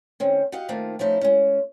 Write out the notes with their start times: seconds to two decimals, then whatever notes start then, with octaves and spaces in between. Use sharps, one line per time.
0.20 D#3 C4 C#4
0.52 F#4 G4 D#5 F5 F#5
0.68 D#3 A3 A#3 C4 D#4 F4
0.99 F3 A3 C#4 D#4 E4
1.21 G#3 C#4